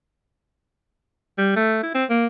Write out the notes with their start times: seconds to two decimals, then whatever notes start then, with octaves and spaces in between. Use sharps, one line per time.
1.38 G3
1.56 A3
1.83 E4
1.95 C4
2.10 A#3